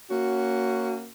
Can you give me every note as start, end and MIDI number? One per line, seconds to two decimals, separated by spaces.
0.11 1.09 58
0.11 1.09 61
0.11 1.09 66